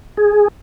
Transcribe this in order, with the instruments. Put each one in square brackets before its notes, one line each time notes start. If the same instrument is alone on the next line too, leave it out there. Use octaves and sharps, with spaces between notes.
[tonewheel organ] G#4